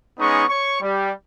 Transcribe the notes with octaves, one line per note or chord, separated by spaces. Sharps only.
G#3 B3 C#4 D#4 D#5 C#6
C#5 C#6
G3